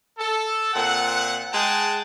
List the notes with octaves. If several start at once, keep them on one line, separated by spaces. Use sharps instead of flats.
A4
A#2 C4 F#5
G#3 G#4 F#5 G5 A5